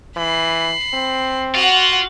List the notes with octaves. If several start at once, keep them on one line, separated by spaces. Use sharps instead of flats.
E3 B5 C7
C4
F4 F#4 F#5